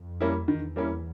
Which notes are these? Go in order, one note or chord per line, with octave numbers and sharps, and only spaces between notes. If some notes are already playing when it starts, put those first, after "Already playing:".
Already playing: F2
G3 A#3 C#4 E4
E2 D#3
G3 A#3 C#4 E4